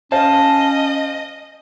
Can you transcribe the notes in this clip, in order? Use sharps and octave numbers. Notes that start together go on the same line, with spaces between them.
C#4 C5 D#5 F5 A5